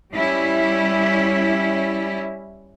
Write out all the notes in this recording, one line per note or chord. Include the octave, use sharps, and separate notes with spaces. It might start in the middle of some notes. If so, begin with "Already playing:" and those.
G3 C#4 E4